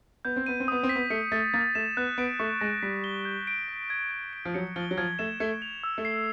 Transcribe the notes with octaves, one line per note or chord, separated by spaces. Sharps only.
B3 G6
C4
B3 D#7
C4
B3 D#6
C4
B6
B3
A3 C#7
A3 A6
A#3 A6
A3 E7
B3 F#6
B3 D7
A3 C#6
G#3 A#6
G3 B6
G7
G6
D7
B6
G#6
G#6
D7
F3
F#3 C#7
F3 G7
F#3
F3 G#6
A3 E7
A3 G#6
F7
E6
A3
C7